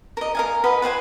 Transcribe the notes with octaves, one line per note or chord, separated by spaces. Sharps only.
A#4 D#5
A#4 F5 G#5
B4 D#5 F#5
B4 C5 F#5 G#5